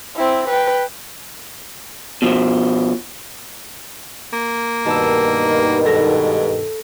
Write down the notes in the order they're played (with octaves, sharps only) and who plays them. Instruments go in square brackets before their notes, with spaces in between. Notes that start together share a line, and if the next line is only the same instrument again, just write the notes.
[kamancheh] C4 E4
B4 G5
[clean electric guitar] B2 F3
[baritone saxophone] A#3
[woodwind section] G2 B2 D#3 [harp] A5 E6
[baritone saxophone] G#2 [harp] A4 A#6